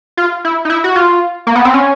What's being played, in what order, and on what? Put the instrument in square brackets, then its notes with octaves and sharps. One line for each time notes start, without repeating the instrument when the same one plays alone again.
[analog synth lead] F4
E4
D#4
E4
F#4
F4
A#3
B3
C4
C#4